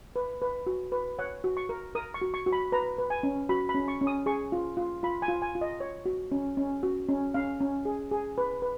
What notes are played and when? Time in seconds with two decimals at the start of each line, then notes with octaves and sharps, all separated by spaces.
0.16 B4
0.42 B4
0.67 F#4
0.92 B4
1.19 C#5 F#5
1.44 F#4
1.57 C#6
1.69 A#4
1.95 A#4 D#6
2.14 C#6
2.21 F#4
2.34 C#6
2.46 F#4
2.53 B5
2.72 B4 A#5
2.98 B4
3.10 G#5
3.23 C#4
3.49 F#4 B5
3.69 B5
3.74 C#4
3.88 C#6
4.01 C#4
4.07 D#6
4.26 G#4 C#6
4.52 F4
4.77 F4
5.03 F4 B5
5.22 G#5
5.28 F4
5.42 G#5
5.55 F4
5.61 D#5
5.80 C#5
6.06 F#4
6.32 C#4
6.57 C#4
6.83 F#4
7.09 C#4
7.34 C#4 F5
7.61 C#4
7.85 G#4
8.11 G#4
8.38 B4
8.62 B4